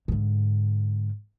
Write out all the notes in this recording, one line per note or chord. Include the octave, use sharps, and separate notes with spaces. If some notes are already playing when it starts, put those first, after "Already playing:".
G#2 D3